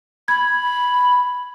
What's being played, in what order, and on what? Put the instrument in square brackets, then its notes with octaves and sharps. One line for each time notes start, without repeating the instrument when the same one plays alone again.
[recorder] B5 [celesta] G#6